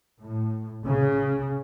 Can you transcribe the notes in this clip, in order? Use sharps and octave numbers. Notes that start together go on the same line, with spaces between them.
A2
C#3